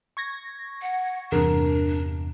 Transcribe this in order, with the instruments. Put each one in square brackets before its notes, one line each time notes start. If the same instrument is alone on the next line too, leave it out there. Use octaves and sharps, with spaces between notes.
[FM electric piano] C#6 G#6 A#6
[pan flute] F#5
[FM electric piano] E2 G2 C3 [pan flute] D4 [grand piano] A#4